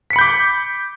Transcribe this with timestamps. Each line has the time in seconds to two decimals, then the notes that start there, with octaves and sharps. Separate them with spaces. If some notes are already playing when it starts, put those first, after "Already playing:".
0.10 B6
0.13 C#7
0.16 B5
0.19 G6
0.21 D6